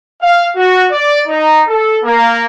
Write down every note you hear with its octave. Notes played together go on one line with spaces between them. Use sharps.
F5
F#4
D5
D#4
A4
A#3